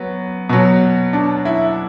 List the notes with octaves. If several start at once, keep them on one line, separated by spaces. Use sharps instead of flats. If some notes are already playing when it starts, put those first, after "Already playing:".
Already playing: F#3 B3
B2 F#3
D4
E4